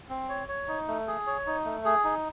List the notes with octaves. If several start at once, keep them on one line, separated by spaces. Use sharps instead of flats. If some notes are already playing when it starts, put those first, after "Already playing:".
C4
C#5
C#5
D#4
A3
G#4
C#5
D#4
A3
G#4
D#4